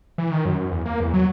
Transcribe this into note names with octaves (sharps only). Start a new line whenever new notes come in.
E3
D#3
F#2
F#2
E2
A#3
E2
F#3